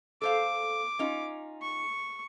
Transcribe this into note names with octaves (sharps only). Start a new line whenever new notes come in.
A4 C5 F5 D6
C#4 D#4 F4
C#6